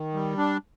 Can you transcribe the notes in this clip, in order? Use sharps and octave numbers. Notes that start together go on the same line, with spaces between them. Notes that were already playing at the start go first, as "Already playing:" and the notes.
Already playing: D#3
G3
D4